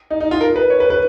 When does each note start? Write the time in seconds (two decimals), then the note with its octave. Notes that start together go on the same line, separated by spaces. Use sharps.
0.11 D#4
0.21 D#4
0.31 F4
0.41 A#4
0.56 B4
0.70 C#5
0.80 B4
0.90 B4